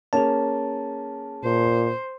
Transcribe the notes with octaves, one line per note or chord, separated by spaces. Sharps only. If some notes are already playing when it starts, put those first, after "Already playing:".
A#3 C#4 G#4 A5
A#2 C5